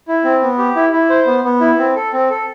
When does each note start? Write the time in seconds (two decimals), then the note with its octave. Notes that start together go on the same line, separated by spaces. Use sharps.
0.08 E4
0.24 C4
0.42 B3
0.58 G4
0.76 E4
0.93 E4
1.10 C5
1.27 B3
1.44 B3
1.61 E4
1.78 C4
1.96 A4
2.13 C4
2.30 A4